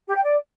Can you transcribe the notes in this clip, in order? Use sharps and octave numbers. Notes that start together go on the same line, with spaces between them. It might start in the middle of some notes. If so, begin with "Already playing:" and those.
G4
G5
D5